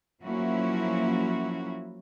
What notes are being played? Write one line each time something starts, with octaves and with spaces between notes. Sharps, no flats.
F3 F#3 A#3 C#4 E4 F#4